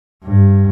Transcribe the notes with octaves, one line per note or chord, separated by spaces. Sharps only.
G2